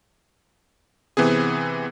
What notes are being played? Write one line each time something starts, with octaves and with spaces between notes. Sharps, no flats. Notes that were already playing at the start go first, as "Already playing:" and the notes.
C3 E3 B3 C4 G#4